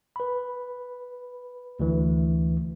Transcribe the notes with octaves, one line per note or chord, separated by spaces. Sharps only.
B4 B5
D2 E3